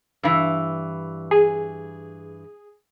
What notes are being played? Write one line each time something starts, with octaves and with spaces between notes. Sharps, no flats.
G2 E3
G#4